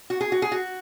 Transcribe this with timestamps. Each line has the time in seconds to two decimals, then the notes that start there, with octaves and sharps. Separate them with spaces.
0.10 F#4
0.21 G#4
0.32 F#4
0.42 G#4
0.52 F#4